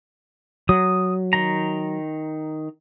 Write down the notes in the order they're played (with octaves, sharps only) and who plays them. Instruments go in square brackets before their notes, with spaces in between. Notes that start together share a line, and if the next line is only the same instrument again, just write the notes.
[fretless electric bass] F#3 [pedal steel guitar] D#6
[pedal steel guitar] D#3 A#5